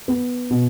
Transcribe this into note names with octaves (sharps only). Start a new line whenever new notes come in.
B3
B2